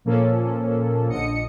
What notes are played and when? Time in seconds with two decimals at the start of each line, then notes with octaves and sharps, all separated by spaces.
0.05 A#2 F3 A#3 C#4 A4
1.08 A#1 D3 D#5 D#6 C#7